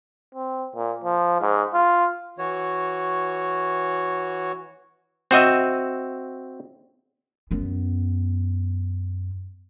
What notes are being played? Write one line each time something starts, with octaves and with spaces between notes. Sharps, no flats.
C4
A#2
F3
G#2
F4
E3 F#4 C#5
C4 F#4 D#5 E5
F#2 B3